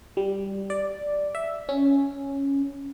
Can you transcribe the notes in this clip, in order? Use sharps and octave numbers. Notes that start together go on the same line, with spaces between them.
G3
D5
E5
C#4